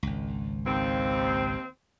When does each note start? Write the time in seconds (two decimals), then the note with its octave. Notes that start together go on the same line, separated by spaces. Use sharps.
0.03 G#1 C#2
0.66 D#2 C4